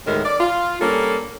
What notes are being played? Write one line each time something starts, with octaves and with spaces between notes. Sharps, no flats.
D2 A2 D#3 G#3 A#4
D5
F4
G3 A#3 C#4 D4 A4